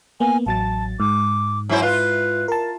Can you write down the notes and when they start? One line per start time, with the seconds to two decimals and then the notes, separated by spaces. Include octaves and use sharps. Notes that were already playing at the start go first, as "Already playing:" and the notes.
0.20 A#3 B3 G#5
0.46 A1 F#3 A5 A6
1.00 G#2 D6
1.69 F#2 E4 C5 C#5
1.82 F4 B4
2.48 A#4 A5